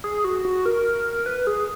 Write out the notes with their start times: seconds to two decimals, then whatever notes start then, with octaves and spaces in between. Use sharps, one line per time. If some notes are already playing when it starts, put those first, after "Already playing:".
0.04 G#4
0.24 F#4
0.45 F#4
0.66 A#4
1.26 B4
1.47 G#4